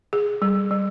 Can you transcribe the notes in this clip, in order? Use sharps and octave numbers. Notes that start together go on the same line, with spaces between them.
G#4
G3
G3